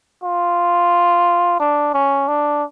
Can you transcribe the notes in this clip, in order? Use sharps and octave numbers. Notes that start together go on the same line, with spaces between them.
F4
D4
C#4
D4